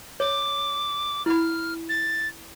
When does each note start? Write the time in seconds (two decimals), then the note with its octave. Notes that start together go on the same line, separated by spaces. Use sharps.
0.20 C#5 D6
1.26 E4 B5 F6
1.89 A6